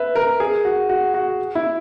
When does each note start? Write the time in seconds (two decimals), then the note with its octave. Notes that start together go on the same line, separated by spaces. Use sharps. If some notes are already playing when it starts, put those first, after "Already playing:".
Already playing: B4 E5
0.16 A#4
0.40 G#4
0.65 F#4
0.89 F#4
1.14 F#4
1.55 E4